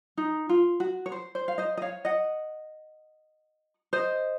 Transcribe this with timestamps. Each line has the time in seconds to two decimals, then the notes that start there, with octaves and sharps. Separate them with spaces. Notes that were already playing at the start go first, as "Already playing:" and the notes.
0.17 D#4
0.49 F4
0.80 F#4
1.06 C#5
1.12 C5
1.35 C5
1.48 F5
1.58 C5 D#5
1.77 D#5
1.82 C#5 F5
2.05 D#5 F#5
3.93 C5 D#5